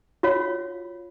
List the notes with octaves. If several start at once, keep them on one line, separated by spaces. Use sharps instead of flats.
F4 F#4 C#5 F5